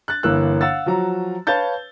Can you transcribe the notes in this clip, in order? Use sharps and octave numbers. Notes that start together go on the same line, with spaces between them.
F#6 A6
G1 E3 A#3 E6 F#6
F5 F#5 E6 A6
F3 F#3 F#4 A#5
B4 C#5 F5 A5 G6 A6